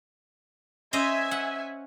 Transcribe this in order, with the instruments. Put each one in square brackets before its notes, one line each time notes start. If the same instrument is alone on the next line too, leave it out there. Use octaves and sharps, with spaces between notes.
[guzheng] C#4 C5 D#5 [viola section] E5 G#5
[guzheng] F#5